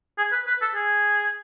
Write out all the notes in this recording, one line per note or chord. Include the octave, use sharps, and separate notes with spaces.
G#4
B4
B4
A4
G#4